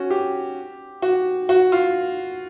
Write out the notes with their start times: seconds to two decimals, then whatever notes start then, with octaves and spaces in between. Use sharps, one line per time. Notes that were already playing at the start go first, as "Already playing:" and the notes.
Already playing: C#4 F#4
0.10 G4
1.02 F#4
1.49 F#4
1.72 F4